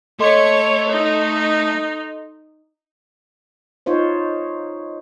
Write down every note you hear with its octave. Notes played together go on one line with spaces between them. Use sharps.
A3 A4 C#5 D#5 C6
D#4
D#4 F4 C5 C#5